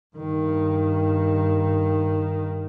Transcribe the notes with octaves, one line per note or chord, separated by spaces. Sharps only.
G2 D#3